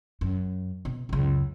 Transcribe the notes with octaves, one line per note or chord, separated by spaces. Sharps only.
F#2
B2
C#2 F#2